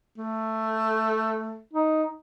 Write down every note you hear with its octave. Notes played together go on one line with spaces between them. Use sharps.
A3
D#4